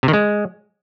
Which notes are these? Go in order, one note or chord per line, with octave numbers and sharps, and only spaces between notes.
C3
D#3
G#3